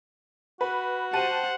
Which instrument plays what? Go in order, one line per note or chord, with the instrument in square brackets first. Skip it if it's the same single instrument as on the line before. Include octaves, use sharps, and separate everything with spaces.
[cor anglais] F#4 [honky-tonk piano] B4
[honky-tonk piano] G4 A5 D#7 [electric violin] C5 F#5